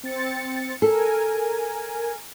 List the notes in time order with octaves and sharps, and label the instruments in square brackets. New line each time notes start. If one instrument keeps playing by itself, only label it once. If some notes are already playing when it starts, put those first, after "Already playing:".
[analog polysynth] C4 A6 C#7
[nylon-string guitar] A4 [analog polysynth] A#4 G#5